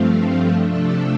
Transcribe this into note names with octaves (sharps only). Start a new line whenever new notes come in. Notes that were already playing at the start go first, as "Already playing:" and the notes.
Already playing: G2 F3 A3 C4 F4
C3 F3 A3 D4 A4